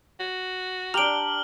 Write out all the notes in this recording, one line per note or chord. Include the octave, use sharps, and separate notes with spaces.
F#4
D4 G4 A#5 F6 D7 F#7 G7